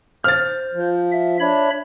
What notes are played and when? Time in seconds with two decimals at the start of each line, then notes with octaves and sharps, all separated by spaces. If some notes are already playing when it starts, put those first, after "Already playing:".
0.24 C5 F6 A6
0.74 F3
1.11 E5
1.40 D4 C#5 E5 B5